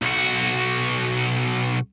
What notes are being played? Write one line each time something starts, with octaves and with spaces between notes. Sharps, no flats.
B1 F#4